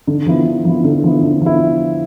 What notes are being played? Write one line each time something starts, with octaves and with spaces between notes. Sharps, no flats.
D3
F3 B3 E4
D3
F3 B3 E4
D3
F3 B3 E4
D3
F3 B3 E4